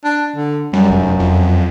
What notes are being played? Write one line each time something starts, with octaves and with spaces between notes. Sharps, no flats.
D4
D3
F#2 G3
F1
F2